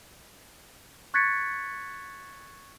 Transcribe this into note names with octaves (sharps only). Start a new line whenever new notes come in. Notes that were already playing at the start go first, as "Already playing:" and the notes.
C#6 F#6 G#6 A6 B6 C#7